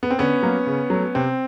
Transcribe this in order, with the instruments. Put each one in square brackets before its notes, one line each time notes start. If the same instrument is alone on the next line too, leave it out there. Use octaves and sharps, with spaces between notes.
[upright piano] B3
C4
D3 B3 C#4
F#3 A#3
C#3
F#3 A3
C3 C4